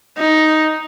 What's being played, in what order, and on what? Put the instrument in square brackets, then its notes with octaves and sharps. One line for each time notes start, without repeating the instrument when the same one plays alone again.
[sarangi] D#4